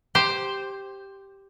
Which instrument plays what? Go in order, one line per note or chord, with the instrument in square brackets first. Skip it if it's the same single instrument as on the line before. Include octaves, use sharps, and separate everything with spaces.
[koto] G4 C5